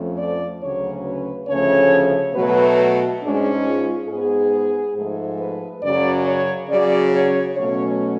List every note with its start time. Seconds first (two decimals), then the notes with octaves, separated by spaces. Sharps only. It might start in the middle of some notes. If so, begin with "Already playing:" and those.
Already playing: F2 F3 A3 C#4
0.18 D5
0.62 D2 C#3 F#3 C#4 C#5
1.05 B4
1.48 D2 C#3 F3 A3 C#4 C#5
2.35 B2 F#3 A3 B4
3.22 G#2 G#3 C#4 D4
3.66 F4
4.09 G#2 G#3 B3 G#4
4.96 G#2 F3 A3
5.39 B4
5.83 F#2 C#3 F#3 D5
6.26 C#5
6.70 C#3 F#3 C#4 D5
7.13 C#5
7.56 B2 F#3 A3 C#4 C#5